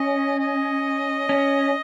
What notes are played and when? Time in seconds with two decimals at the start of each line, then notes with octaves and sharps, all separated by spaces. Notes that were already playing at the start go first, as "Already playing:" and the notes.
Already playing: C#4 D#5
0.39 D#5
1.29 C#4